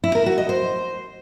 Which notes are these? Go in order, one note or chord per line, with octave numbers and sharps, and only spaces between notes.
E4
A#4
F#4
D#5
C5